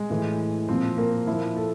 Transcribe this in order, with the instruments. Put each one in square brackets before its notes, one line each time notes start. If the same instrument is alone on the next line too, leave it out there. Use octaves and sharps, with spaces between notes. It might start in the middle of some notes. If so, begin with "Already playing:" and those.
Already playing: [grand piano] G#3
A2 E3
A#2 F3 C4
A#3
A#2 F3 E4
A4